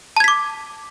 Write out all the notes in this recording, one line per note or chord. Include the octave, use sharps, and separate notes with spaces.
A5 D6 G#6 B6